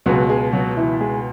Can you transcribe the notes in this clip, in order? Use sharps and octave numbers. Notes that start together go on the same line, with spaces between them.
C#2 B2 F#3 G#3 F#4
G#3 G#4
F#3 F#4
E3 E4
G#3 G#4